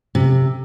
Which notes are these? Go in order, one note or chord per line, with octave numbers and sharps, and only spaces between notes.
C3